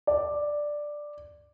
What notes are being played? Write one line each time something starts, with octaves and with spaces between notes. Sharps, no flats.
D5